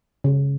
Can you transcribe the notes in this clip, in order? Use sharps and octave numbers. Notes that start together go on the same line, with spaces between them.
C#3